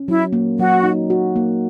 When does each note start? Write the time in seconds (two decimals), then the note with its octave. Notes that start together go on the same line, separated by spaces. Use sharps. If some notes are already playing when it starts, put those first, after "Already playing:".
Already playing: C#4
0.08 F#3 E4
0.33 A#3
0.58 F#3 F#4
0.84 D#4
1.10 F#4
1.36 A#3